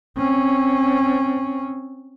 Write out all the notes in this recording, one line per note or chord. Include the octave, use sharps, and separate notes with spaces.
C4 C#4